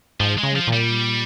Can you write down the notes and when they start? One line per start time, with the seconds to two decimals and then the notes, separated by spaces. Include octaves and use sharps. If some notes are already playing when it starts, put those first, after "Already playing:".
0.20 G#2 F3
0.38 G#3
0.43 C#3
0.56 F3
0.67 A#2
0.73 G3